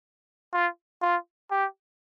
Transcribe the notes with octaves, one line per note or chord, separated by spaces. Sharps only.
F4
F4
G4